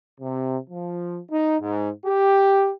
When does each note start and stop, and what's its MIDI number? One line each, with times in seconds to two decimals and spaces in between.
0.20 0.57 48
0.70 1.19 53
1.31 1.57 63
1.61 1.90 44
2.06 2.70 67